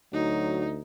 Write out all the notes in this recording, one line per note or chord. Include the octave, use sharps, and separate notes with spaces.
D2 F#3 D#4